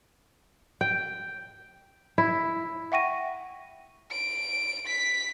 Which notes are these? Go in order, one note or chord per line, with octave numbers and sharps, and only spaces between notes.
G5
E4
E5 F#5 G5 C#6 A#6 D#7
D7
B6